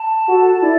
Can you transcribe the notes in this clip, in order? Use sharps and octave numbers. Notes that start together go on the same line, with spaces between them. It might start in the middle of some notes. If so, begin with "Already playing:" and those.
Already playing: A5
F#4 A4
E4 D5